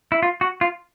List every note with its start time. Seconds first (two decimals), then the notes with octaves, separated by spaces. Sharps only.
0.12 E4
0.23 F4
0.41 F#4
0.61 F4